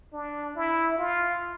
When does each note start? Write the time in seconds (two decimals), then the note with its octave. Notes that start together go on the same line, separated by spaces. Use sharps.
0.13 D4
0.55 E4
0.98 F4